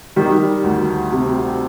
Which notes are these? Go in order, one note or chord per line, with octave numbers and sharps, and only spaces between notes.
D#3 G3
D2
C3